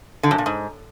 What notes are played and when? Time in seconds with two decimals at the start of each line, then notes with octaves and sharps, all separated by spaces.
0.23 D3
0.31 F#2
0.38 A#2
0.46 G#2